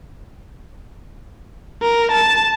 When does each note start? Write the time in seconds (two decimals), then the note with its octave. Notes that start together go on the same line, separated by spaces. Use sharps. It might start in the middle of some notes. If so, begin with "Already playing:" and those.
1.82 A#4
2.12 A5